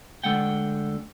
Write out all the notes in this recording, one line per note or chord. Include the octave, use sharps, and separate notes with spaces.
D2 G#2 D3 G#3 F#5 G5